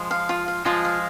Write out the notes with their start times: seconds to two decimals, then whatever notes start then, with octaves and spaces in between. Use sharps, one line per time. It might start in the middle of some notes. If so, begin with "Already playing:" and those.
Already playing: F3 G#3
0.11 F5
0.29 F4
0.48 F5
0.65 F3 G#3 F4
0.85 F5